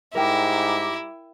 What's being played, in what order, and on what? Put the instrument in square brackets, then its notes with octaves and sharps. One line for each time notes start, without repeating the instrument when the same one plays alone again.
[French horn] G#2 [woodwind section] G3 A#5 D6 [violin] E4 [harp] A#4 G5